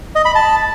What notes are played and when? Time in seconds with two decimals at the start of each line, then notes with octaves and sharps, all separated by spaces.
0.15 D#5
0.25 B5
0.35 A5